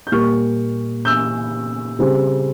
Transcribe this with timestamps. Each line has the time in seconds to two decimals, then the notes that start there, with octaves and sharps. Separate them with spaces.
0.07 G6
0.12 A#2 G3 A#3 C#6 F6
1.05 E6 G6
1.99 C#3 G3 C4